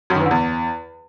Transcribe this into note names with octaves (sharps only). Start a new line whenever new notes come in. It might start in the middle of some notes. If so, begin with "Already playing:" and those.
F#2
D#3
E3
D3
E2